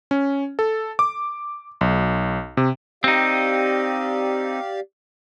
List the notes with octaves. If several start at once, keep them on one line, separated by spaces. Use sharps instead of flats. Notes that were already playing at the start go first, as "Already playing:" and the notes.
C#4
A4
D6
B1
C3
C4 D#4 G4 D5 F5